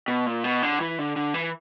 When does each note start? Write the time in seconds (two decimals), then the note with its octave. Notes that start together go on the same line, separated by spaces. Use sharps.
0.08 B2
0.26 A#2
0.44 B2
0.63 D3
0.80 E3
0.99 D3
1.16 D3
1.34 E3